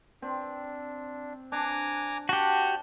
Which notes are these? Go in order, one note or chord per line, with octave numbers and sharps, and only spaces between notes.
C4 D4
D4 G#5 A#5 D6
F#4 G4 F#5 A5